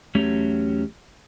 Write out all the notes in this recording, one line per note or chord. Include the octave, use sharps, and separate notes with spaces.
E2 F#3 A3 C#4 G4 C#5